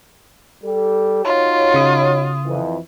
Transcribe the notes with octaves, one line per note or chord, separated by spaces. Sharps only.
G3 G4 A4
D#4 F4 F#4 C#5
C#3 D#6
F2 E3